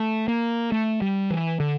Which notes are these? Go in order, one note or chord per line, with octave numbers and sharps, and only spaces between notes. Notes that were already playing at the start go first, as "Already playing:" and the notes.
Already playing: A3
A#3
A3
G3
E3
D3